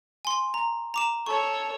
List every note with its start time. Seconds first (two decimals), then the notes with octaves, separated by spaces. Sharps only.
0.25 G#5 C6
0.54 A#5
0.94 A#5 D6 E7
1.26 A4 C#5 C#6